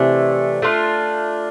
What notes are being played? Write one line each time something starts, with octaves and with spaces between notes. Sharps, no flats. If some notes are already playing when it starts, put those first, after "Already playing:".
Already playing: C3 E3 A3 D4
A3 D4 F4